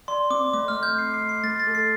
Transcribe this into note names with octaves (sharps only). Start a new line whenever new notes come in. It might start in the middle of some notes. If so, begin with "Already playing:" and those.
D5 C6
C4 D6
A3 D6
F6
A3
G6
A3 C7
C7
A3
C7
A3 A6
A6
A4
C7